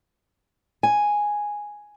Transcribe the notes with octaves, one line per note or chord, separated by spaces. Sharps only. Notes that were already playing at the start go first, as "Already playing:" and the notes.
G#5